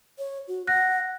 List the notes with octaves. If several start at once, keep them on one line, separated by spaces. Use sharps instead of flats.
C#5
F#4
F#5 F#6 A#6